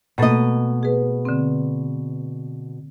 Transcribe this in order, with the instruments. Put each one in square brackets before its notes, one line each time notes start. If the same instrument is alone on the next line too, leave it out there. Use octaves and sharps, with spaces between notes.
[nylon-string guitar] B2 D#5 [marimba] A3 A#3 A4
[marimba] G#4 B4
D3 C4